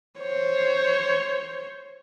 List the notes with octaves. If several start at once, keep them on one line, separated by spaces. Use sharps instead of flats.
C5 C#5